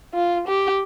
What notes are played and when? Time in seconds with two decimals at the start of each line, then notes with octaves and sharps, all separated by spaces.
0.14 F4
0.48 G4